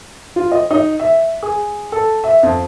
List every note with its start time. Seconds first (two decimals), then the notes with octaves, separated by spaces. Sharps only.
0.36 F4
0.52 D#5
0.71 D#4
1.00 E5
1.43 G#4
1.92 A4
2.24 E5
2.43 F2